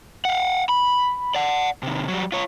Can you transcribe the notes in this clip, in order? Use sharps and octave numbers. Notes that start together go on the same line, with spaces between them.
F5 F#5
B5
D5 F#5
C3 D#3
F#3 G3
F4 C#5